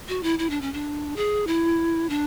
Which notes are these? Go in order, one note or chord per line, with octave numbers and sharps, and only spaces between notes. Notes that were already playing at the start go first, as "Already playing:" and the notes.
F#4
E4
E4
D4
C#4
D4
G#4
E4
D4